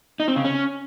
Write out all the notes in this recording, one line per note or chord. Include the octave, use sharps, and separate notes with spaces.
D#4
C4
C#3
C#4